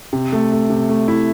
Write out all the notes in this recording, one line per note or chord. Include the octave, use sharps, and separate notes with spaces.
C3
A3
A3
C3
A3
E4